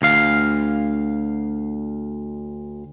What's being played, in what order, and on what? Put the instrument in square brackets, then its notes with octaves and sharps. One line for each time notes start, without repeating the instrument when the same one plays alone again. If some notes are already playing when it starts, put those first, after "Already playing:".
[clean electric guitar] D2 F5